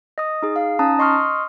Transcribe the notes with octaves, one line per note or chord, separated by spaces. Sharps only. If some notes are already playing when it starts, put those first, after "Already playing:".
D#5 D#6
D#4 G#4
F5
C#4 D#4 A5 A#5 D#6
D#5 C6 C#6 D#6 F6